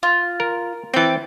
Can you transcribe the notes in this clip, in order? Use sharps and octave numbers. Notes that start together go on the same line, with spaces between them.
F4
A#4
E3 C4 G5 A5